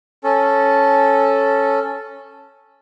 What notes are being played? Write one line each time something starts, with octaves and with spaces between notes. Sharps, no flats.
C#4 A4